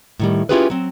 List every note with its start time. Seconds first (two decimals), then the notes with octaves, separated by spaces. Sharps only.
0.20 A2 D#3 G3
0.49 C#4 E4 F4 G4 G#4 B4
0.70 F#3 C4